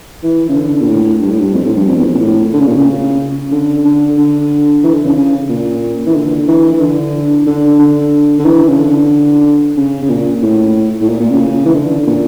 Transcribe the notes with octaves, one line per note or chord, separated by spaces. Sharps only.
E3
C#3
D3
A#2
A2
G2
A2
G2
F2
A2
G2
F2
E2
F2
A#2
A2
D3
C#3
A#2
C#3
D3
D3
D3
E3
D3
C#3
C#3
A#2
E3
D3
E3
E3
D3
D3
D3
D3
E3
C#3
D3
C#3
C#3
A#2
A2
A2
A#2
A#2
C#3
E3
D3
A#2